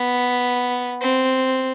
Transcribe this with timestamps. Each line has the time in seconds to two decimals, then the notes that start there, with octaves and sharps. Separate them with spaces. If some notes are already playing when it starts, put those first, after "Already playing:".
Already playing: B3
1.01 C4